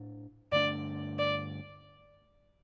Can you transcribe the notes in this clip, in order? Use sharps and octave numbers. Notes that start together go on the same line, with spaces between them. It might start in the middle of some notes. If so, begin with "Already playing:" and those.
Already playing: A2 D4
G2 D3 A3 D4 D5
D5